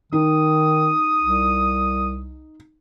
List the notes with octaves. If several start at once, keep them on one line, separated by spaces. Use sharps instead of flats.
D#3 D#4 D#6
C2